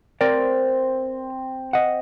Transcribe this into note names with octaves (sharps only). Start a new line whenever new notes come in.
C4 A#4 D5
D#5 F#5